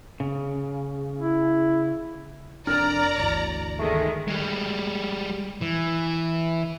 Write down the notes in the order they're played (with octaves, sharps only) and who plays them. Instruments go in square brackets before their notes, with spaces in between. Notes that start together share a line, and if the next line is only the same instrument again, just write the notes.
[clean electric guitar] C#3
[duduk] E4
[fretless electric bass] F1 F2 D4 [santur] A#4 [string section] D5 A#5
[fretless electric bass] G1 D2 E3
[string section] D#3 G#3 [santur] A3
[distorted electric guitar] G3 G#3
E3